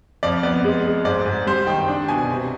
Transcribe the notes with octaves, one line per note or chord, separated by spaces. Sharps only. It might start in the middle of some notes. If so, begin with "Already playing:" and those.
F2 D5
B3 D5
G#3
G#3
G#2 D5
G#2
G3 C5
D#3 G5
D4
B2 G#5
C3